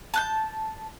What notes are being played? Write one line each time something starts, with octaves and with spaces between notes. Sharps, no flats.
A5 F#6 G6